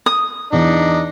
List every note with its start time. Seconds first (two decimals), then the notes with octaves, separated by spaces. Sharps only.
0.06 D#6
0.52 E2 D4 D#4